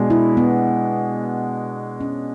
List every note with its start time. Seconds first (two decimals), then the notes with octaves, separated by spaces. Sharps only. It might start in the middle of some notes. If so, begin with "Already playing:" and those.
Already playing: B2 G#3 D4
0.10 E4
0.37 B3
2.00 C#4